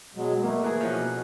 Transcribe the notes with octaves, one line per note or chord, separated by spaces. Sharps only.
B2 F#3 G#3
A3 A#3
E3 G#4
B2 F3 C#4 F#4